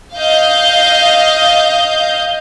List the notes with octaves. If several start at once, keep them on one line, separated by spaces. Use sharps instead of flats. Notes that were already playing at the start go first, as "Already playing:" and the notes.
D#5 F5 G6